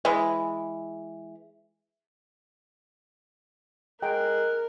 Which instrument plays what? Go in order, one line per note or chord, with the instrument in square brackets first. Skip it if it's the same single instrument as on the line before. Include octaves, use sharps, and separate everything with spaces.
[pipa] E3 G#3
[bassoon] G#3 [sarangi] A#4 [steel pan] G5 A#5 [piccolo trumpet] F#6